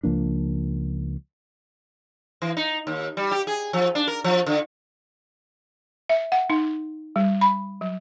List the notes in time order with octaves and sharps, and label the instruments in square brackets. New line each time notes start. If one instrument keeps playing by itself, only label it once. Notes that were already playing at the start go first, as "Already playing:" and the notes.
[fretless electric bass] C#2 F3 A#3 D4
[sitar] E3
D#4
D#2
G3
G4
G#4
F3
D4
A#4
F3
D3
[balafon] E5
F#5
D#4
G3
B5
F#3